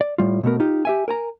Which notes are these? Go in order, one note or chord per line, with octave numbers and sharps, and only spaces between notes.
D5
A2 G3 F4
B2 A3 B3 A#4
D#4 F4 G4
G4 E5 G#5
A#4 G#5 A#5